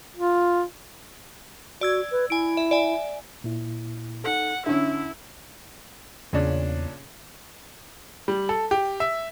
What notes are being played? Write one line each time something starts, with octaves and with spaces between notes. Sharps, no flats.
F4
F#4 D5 E6 G#6
B4
E4 G#5 D7
E5
D5 E5 G#5
A#2 E4
D#4 A4 F#5
D3 C#4 E4 E5
E2 A#2 C#3 C#4 D4
G3
A4
G4
E5